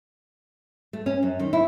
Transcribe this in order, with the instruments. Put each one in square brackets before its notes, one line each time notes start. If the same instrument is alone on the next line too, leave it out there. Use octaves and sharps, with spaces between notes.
[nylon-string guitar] A3
C#4
F#2
D#3
E4